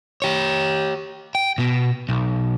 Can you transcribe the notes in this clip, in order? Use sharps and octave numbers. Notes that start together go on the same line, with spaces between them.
G4 C#5
G5
B2 B3
B1